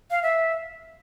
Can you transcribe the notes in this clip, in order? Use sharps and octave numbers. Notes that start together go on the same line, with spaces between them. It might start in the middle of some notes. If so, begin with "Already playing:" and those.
F5
E5